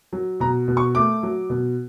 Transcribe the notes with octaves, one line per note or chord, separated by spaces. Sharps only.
F#3
B2 A#5
B2
C#6
A3 D6
F#3
B2